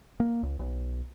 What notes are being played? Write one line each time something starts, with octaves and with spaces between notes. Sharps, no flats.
A#3
C#2
B1